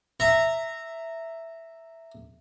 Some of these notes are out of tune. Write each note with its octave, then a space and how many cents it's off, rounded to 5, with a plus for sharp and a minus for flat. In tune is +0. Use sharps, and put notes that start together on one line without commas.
E5 +0 A#5 -15